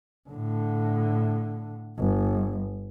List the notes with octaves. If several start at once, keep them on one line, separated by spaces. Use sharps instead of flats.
A2 D3
G1